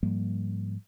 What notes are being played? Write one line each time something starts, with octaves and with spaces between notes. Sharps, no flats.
G#2 F3 G3 A#3